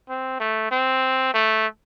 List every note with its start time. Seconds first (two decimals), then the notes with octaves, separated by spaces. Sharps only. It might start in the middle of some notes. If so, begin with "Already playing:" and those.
0.09 C4
0.40 A3
0.71 C4
1.34 A3